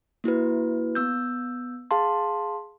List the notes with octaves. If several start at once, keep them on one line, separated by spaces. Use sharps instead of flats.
A#3 E4 F#4 B4
B3 E6 G6
G#4 F5 A5 C6